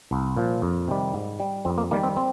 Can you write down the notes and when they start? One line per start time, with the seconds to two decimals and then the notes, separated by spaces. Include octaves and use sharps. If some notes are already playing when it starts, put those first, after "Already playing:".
0.11 C2
0.37 A#2 F3
0.62 F2
0.88 C3 D#3 G3
1.14 G#2
1.40 G3
1.65 F2 C4
1.78 A#3
1.91 D#3 G3 A#3
2.03 C4
2.17 C4